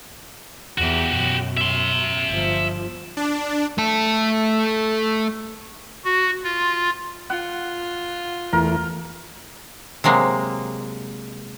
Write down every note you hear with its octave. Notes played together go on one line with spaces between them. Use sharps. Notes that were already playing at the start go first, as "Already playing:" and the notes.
E2 E3 F#4 G4
F#2 B2
E5 C6
G1 F3
D4
A3 A4
F#4
F4
F4 F#5
E2 E3 A3 A#4
C3 F#3 G#3 A#3